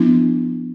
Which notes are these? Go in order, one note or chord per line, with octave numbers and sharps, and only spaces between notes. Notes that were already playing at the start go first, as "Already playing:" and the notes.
Already playing: F3 B3 D4 E4